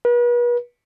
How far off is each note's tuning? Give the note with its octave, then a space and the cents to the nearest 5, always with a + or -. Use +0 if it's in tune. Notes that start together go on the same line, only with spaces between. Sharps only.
B4 -40